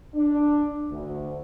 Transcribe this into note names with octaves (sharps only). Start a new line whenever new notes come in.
D4
D2